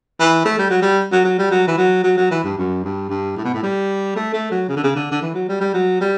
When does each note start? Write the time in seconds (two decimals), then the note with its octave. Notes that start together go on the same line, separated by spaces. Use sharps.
0.20 E3
0.45 A3
0.58 G3
0.70 F#3
0.82 G3
1.12 F#3
1.24 F#3
1.38 G3
1.51 F#3
1.67 E3
1.77 F#3
2.04 F#3
2.17 F#3
2.31 E3
2.44 G2
2.57 F#2
2.84 G2
3.09 G2
3.37 A2
3.44 B2
3.54 A2
3.63 G3
4.16 A3
4.33 A3
4.51 F#3
4.68 C#3
4.77 D3
4.83 C#3
4.96 D3
5.11 D3
5.22 E3
5.35 F#3
5.48 G3
5.61 G3
5.74 F#3
6.01 G3